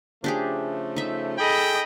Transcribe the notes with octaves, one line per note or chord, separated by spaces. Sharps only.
C#3 F3 A3 D4 G4 G#4
D#4 E5
G#4 A4 D#5 G5 B5